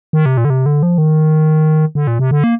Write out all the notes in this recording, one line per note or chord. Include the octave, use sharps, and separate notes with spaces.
D#3
C3
A#2
D3
C3
D3
F3
D#3
D3
A#2
C3
D3
A#3